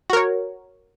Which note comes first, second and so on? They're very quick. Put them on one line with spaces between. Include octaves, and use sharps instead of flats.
F#4 A#4 C#5